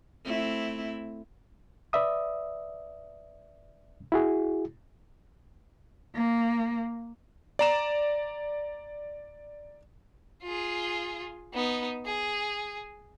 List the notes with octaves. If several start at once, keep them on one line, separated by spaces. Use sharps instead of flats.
A3 C4 E4
B4 D5 E5 D#6
E4 F#4 G#4
A#3
D5 A#5 E7
F4 G#4
B3 D#4
G#4